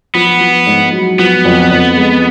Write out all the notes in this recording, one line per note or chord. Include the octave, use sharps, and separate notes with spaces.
F3 B3
F3
G#2
F#3
F3 B3
F2
F2
G#3